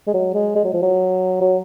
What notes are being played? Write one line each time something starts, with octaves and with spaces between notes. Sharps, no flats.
G#3
F#3
G#3
G#3
F#3
F3
F#3
F#3